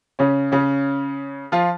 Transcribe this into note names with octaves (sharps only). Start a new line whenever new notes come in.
C#3 C#4
C#3 C#4
F3 F4